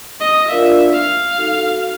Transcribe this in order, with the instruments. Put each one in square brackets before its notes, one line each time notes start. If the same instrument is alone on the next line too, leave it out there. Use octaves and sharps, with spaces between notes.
[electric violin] D#5
[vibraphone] D4 F4 A#4 D5 F5 [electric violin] E5
[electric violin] F5
[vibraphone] D#4 F#4 A4